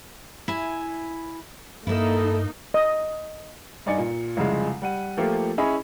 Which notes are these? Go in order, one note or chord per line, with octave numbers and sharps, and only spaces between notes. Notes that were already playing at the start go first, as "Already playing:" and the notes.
E4 G#5
G2 A#3 D#4 E4 A4
D#5
G2 D#4 D5 G#5 C#7
A#2
C2 F2 C#3 G#3
G3 F#5 D#7
F3 A3 A#3 F4 G4
C#4 E4 G#4 D#5 B5